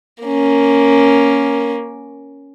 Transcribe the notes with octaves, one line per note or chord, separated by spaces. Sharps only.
A#3 C#4